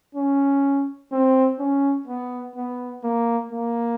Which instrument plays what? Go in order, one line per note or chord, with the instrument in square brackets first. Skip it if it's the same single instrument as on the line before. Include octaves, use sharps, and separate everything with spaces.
[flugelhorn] C#4
C4
C#4
B3
B3
A#3
A#3